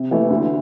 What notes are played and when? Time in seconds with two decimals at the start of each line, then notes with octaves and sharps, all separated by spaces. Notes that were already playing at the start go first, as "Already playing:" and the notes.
Already playing: C3
0.11 E3 A3
0.30 D2